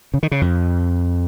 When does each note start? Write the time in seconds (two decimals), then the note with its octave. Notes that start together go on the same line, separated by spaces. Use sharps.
0.14 C#3
0.23 D#3
0.31 C#3
0.41 F2